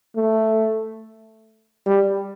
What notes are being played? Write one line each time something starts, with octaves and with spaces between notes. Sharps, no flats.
A3
G3